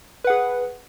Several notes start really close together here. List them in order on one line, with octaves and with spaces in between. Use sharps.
B4 F#5 G#4